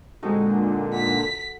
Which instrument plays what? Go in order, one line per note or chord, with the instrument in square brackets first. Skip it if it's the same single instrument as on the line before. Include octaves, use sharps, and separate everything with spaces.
[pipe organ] A#2 D3 [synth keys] G#3 C4 D#4 [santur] F#4 A4
[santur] F#5 [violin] B6